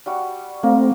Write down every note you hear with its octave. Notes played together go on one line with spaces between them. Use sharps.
G3 F#4
A3 A#3 C4